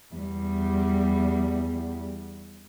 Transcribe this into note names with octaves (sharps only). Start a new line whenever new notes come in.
E2 G3